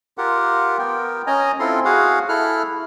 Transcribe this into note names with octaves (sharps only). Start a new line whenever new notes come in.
F4 G4 A#4 F#5
B3 A#4 G5
C#4 D#5 G#5 A#5
C4 E4 F4 A4 C6
F#4 G#4 F5 F#5
E4 A4 F6 F#6